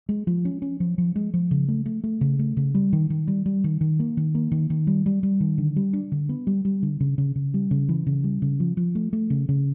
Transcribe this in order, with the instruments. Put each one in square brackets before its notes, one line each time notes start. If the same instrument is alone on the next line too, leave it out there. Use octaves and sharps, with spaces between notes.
[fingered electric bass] G#3
F3
C#4
C#4
F3
F3
G#3
F3
C#3
A3
A3
A3
C#3
A3
C#3
G3
D#3
D#3
G3
G3
D#3
D#3
A#3
D#3
A#3
D#3
D#3
G3
G3
G3
D#3
D3
G3
D4
D3
B3
G3
G3
D3
C#3
C#3
C#3
G3
C#3
E3
C#3
G3
C#3
F3
F3
A3
A3
C#3
C#3